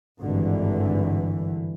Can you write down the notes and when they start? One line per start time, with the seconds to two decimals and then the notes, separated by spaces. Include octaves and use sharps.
0.21 G#1 G2 D3 E3